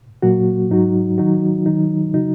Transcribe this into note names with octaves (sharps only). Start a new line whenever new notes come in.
A#2 F#3 A#3 F#4
G#2 F#3 D#4 F#4
D#3 F#3 D#4 F#4
D#3 F#3 D#4
C#3 F#3 D#4 F#4